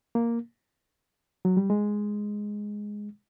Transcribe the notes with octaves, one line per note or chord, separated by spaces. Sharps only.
A#3
F#3
G3
G#3